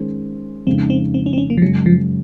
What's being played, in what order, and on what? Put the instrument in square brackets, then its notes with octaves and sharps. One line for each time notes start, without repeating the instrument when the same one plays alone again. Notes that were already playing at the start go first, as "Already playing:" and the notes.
Already playing: [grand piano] D#3 G#3 C#4 G#4 C5
[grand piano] F2 C#3 G#3 D#4 [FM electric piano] C4
[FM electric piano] C4
C4
C#4
C4
C#4
A#3
F3
[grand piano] F#2 C#3 G#3 [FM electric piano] F#3
[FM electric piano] F3